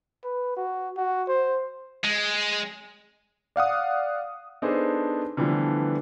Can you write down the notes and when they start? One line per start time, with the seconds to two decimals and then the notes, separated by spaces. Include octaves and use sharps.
0.24 B4
0.57 F#4
0.96 F#4
1.28 C5
2.04 G#3
3.56 D5 F5 F#5 D#6
4.62 B3 D4 D#4 G#4 A4 C5
5.37 D3 E3 F3 G3 A3 B3